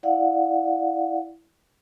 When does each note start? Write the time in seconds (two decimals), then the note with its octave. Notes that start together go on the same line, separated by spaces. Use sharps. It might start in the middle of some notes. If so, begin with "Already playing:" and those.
0.03 E4 D5 F5 F#5